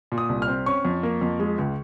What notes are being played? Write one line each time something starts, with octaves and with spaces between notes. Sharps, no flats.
A#2
D#6
C2
F6
C4
C#4 C#6
F2
A#3
F2
G#3
C#2